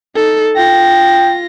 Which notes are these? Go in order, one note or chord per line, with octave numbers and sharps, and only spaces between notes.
D#4 A4
F4 G5 A#6